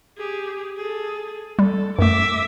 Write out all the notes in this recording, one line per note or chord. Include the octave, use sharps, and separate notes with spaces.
G4 G#4
G#4 A4
G3 A4
F#2 A3 E5 D6